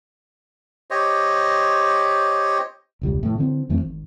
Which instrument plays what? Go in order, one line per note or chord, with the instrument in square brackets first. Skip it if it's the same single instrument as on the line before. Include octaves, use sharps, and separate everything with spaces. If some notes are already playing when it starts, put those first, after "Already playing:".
[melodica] G4 C5 C#5 D#5
[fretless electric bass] E1 C#2 G3
A2 E3
D3 E3 C4
F2 E3 A3 C4
G#1